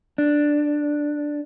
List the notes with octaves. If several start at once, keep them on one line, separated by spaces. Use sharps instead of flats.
D4